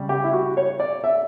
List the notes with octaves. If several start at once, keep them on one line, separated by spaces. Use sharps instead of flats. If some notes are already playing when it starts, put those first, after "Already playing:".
Already playing: C#3 G3
G4
E4
F#4
C#5
D5
E5